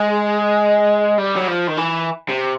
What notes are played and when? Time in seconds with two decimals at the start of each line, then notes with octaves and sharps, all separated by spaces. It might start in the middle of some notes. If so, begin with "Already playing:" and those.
Already playing: G#3
1.18 G3
1.36 F#3
1.48 F3
1.68 D#3
1.77 E3
2.29 C3